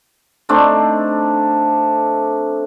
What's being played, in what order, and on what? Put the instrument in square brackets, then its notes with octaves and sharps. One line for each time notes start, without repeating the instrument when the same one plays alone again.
[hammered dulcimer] A3 C4 D4 D#4